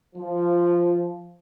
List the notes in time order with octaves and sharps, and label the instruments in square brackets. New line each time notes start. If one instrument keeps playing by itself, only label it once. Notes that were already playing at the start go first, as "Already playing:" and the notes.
[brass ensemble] F3